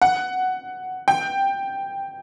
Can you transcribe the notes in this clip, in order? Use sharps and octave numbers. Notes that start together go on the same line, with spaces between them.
F#5
G5